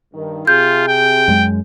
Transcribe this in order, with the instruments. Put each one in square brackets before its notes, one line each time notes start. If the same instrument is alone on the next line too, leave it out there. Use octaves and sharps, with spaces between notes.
[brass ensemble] G2 D#3
[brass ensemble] C3 G#4 [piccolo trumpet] F4 [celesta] G6
[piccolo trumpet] G5
[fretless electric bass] F#2 G#3